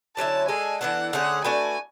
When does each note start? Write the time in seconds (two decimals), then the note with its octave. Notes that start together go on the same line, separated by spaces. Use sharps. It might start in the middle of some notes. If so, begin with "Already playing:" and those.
0.16 D3 F#3 C#4 E4 A5
0.48 G#3 D4 A4 G#5
0.81 E3 B3 D4 A4 F#5
1.13 D3 A3 C#4 G#4 F#5
1.44 A3 D4 F#4 B4 G#5